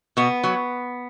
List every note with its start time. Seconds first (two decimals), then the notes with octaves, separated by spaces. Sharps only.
0.17 B2 B3
0.44 F#3